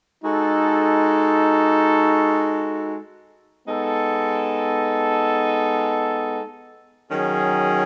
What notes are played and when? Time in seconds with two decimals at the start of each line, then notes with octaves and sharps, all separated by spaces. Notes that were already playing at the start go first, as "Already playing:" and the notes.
0.24 G#3 D#4 F#4 A4
3.67 G#3 B3 D#4 A4
7.11 D#3 F#3 C#4 G#4